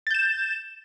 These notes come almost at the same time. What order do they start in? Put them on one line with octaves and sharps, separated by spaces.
A6 G6 E7